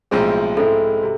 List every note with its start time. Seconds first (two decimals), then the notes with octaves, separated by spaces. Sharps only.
0.11 B1 A2 F3 G#3 C4 G#4
0.57 G#2 G#3 C4 E4 A4
1.02 C3